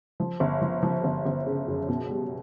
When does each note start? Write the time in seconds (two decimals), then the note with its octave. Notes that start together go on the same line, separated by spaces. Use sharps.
0.20 F3
0.40 G1
0.61 F3
0.83 F3
1.04 G1
1.26 G1
1.46 C#3
1.68 F#2
1.89 B2
2.09 G3